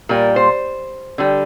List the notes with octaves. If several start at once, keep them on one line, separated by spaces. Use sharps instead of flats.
A#2 G3 A#4
C5
D3 G3